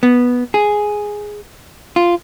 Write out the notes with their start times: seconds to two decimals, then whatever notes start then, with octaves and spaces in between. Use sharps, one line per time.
0.03 B3
0.54 G#4
1.96 F4